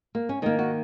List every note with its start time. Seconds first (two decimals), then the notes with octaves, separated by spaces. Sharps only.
0.15 A#3
0.29 C#4
0.42 D#3 A#3 D#4
0.59 F#4